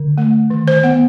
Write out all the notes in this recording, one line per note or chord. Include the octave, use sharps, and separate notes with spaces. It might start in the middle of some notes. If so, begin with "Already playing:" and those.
Already playing: D3
A3
D#3
C5
B3 F#5